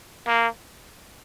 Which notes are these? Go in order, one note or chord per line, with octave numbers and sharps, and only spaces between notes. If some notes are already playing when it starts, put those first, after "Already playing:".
A#3